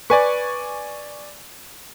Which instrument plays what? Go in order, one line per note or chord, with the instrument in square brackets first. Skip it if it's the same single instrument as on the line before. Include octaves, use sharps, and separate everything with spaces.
[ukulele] B4 [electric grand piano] D5 G#5 C#6